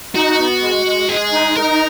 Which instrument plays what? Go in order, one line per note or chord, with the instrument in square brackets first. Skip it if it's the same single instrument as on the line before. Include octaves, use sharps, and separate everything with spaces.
[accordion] D#4 [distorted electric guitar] F#4
[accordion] B3
G#3
G#3
[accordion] G#3 [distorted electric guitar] G#4
[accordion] D#4
[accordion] D#4 [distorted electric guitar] A#4